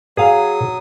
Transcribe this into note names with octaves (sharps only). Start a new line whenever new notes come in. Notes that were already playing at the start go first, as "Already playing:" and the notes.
F#3 G#4 F5 D#6